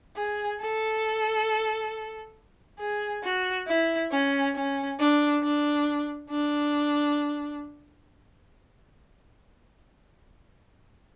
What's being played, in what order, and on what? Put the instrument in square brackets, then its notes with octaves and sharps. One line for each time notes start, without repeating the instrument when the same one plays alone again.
[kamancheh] G#4
A4
G#4
F#4
E4
C#4
C#4
D4
D4
D4